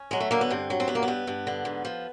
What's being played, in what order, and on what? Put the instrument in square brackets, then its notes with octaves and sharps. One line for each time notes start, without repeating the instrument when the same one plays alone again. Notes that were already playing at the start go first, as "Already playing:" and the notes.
Already playing: [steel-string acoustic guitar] C#4
F#3 G#3
A3
D3 A#3
B3
G2 C4
F#3
C4
G2 B3
A#3
B3
G2
G2
D3
G#2
F3